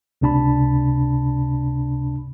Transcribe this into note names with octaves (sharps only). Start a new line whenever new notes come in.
C#2 C3 D4 A5 B5